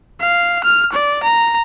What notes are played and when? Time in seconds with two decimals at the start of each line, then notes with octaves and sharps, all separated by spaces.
0.20 F5
0.64 F6
0.93 D5
1.23 A#5